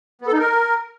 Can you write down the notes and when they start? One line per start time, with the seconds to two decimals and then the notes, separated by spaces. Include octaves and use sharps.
0.22 B3
0.27 A4
0.33 D#4
0.39 A#4